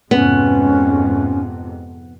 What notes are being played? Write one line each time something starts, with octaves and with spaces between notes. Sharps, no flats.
F2 G#2 C3 B3 C#4